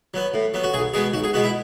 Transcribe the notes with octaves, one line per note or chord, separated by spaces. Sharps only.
F#3 B3
A2
F#3 B3
F#4
B1 G#4
B2 G#3 B3 G#4
B1 F#4
G#4
B2 G#3 B3 F#4
E4